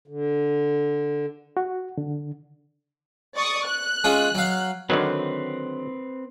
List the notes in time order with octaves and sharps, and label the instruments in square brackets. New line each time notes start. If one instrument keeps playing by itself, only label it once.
[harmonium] D3
[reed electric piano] F#4
D3
[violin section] D5 C#6 D#6
F#6
[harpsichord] G#3 C#4 F4
F#3 F5
[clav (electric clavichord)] D3 D#3 F#3 [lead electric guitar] C4 B4